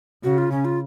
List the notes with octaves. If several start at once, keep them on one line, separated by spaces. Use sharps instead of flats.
C#3 F#4
F4
C#4
F4